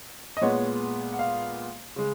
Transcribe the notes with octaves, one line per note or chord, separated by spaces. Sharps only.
D#5
A#2 G#3 B3 C#5
F#5
F5
C#3 G#3